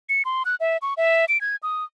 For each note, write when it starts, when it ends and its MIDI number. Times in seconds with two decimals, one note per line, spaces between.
0.09 0.23 97
0.25 0.43 84
0.45 0.55 90
0.60 0.77 76
0.82 0.94 85
0.97 1.25 76
1.29 1.40 98
1.41 1.56 92
1.63 1.84 87